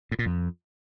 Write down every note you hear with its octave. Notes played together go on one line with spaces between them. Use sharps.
A2
A#2
F2